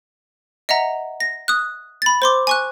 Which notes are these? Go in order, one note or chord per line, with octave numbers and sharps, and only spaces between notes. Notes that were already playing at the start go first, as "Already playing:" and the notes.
D#5 E5 F#5 A#5
A#6
D#6 F#6
B5 A6
C5 C6 D6
G#5 C#6 F#6